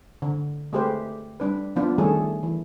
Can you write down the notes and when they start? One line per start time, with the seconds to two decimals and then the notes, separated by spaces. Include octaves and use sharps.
0.22 D3
0.73 G#3 A3 G4 B4 C5
1.40 G3 D4 B4
1.76 F3 B3 D4 F4
1.98 D#3 G3 A3 C#4 G#4 A4
2.43 E3